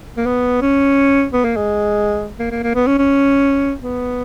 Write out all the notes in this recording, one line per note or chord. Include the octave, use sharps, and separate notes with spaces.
A#3
B3
C#4
B3
A#3
G#3
A#3
A#3
A#3
B3
C#4
C#4
B3